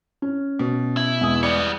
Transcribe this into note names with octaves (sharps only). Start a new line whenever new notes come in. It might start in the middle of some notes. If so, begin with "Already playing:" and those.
C#4
B2
E4
E2 G#3 D#6
G3 B3 D5 C#7